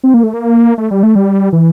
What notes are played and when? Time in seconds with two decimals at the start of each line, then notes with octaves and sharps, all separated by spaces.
0.04 C4
0.14 A#3
0.23 A3
0.34 A#3
0.78 A3
0.91 G3
1.03 A3
1.15 G3
1.53 E3